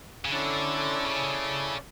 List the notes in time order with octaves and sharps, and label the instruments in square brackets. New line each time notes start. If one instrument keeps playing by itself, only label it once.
[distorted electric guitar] C#3
[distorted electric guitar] D3 [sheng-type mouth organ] C#4 E4 A4 D5
[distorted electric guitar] C#3